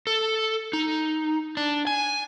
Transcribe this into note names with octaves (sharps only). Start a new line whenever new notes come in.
A4
D#4
D4
G#5